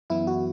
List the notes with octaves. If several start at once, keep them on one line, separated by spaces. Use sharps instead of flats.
F#2 E3 B3 E4
F#4